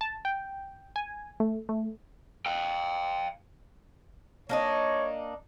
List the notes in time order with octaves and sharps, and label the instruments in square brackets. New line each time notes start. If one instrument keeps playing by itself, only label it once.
[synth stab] A5
G5
G#5
A3
A3
[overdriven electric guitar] F5 G5
[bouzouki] A#3 D4 D#4 [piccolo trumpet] C#5